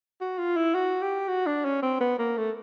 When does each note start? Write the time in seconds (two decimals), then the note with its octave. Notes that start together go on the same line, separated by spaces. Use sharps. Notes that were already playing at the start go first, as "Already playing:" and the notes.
0.21 F#4
0.39 F4
0.56 E4
0.75 F#4
1.02 G4
1.29 F#4
1.47 D4
1.65 C#4
1.83 C4
2.01 B3
2.19 A#3
2.37 A3